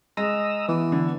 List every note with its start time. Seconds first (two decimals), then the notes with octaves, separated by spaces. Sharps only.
0.17 G#3 A#5 D#6 E6
0.68 E3 B3
0.92 D3